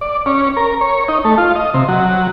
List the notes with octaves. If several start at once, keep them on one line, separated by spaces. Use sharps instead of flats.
D5
C#4
A#4
C#5
D#4
A3
F4
D#5
C3
F#3